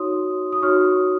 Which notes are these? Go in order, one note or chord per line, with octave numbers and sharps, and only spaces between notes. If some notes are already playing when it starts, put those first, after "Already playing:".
Already playing: D#4 F#4 C#5 C6 D#6
D#6
D#4 F#4 C#5 C#6 F6